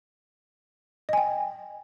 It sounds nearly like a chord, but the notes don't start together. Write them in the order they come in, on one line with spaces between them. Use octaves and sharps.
D#5 G#5 G5